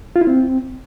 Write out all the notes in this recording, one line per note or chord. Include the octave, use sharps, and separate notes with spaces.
F4
E4
C4